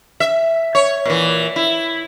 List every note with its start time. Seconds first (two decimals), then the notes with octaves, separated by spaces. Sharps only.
0.20 E5
0.75 C#5
1.05 A#2 E3
1.56 E4